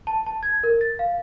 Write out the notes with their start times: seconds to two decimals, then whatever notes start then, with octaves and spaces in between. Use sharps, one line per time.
0.07 A5
0.26 A5
0.43 G#6
0.64 A#4
0.81 A6
0.99 F5